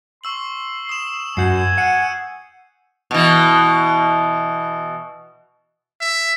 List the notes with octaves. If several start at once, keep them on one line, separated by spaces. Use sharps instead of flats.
C6 C#6 E6 F#7
D#6 E7
F#2 F#4 G#5 G6 C7
F#5 C7 C#7 D#7
B2 E3
E5